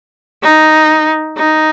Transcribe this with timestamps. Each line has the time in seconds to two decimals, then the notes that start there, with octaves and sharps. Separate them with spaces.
0.43 D#4
1.38 D#4